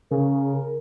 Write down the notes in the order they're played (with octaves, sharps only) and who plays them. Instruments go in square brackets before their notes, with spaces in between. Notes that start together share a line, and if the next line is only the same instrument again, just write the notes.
[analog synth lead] C#3 [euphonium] A#4